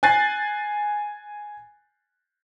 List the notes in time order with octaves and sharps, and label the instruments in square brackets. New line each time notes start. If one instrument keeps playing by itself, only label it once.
[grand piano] G#5 F#6 A6 C7